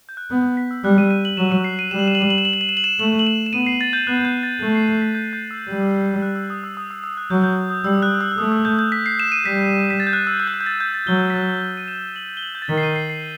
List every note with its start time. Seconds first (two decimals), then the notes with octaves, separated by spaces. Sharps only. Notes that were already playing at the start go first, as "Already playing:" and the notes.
0.09 G6
0.17 F#6
0.30 B3 F#6
0.44 G6
0.57 B6
0.71 E6
0.84 G3 F#6
0.98 D#7
1.11 D#7
1.25 F#7
1.37 F#3 E7
1.52 D#7
1.64 C7
1.79 D#7
1.91 G3 E7
1.99 F#7
2.08 E7
2.15 F#7
2.22 E7
2.30 F#7
2.38 E7
2.45 F#7
2.53 E7
2.61 F#7
2.69 E7
2.77 F#7
2.84 E7
2.99 A3 F#7
3.19 F#7
3.27 E7
3.46 E7
3.53 B3 D#7
3.67 C7
3.81 A6
3.93 G6
4.07 B3 F#6
4.25 G6
4.43 A6
4.61 A3
4.75 C7
4.83 D#7
4.88 C7
5.01 B6
5.15 G6
5.33 G6
5.51 E6
5.69 G3
6.22 F#6
6.36 E6
6.50 D#6
6.64 E6
6.77 D#6
6.91 E6
7.04 E6
7.17 F#6
7.30 F#3 G6
7.44 G6
7.70 D#6
7.84 G3 E6
8.02 F#6
8.21 E6
8.32 E6
8.38 A3 D#6
8.52 E6
8.65 G6
8.79 G6
8.92 B6
9.06 C7
9.20 E7
9.32 D#7
9.46 G3 B6
9.90 B6
10.00 A6
10.07 G6
10.13 F#6
10.27 E6
10.40 E6
10.47 G6
10.54 F#6
10.61 G6
10.66 A6
10.80 G6
10.94 A6
11.07 F#3 G7
11.30 B6
11.34 A6
11.62 G6
11.77 D#7
11.88 E7
12.16 F#7
12.37 G7
12.43 F#7
12.55 G6
12.62 A6
12.69 D#3 B6
12.78 C7
12.83 D#7
12.96 C7
13.10 C7